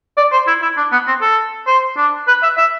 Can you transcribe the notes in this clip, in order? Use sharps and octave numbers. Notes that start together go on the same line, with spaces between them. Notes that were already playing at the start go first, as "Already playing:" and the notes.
D5
C5
E4
E4
D4
B3
C4
A4
C5
D4
B4
E5
E5